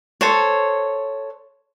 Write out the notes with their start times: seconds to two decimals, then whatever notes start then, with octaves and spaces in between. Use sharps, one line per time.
0.21 A4 C5 C#5